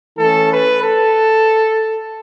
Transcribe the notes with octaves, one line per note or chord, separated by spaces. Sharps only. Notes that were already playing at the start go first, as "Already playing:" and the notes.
E3 A3 C#4 A4
B4
A4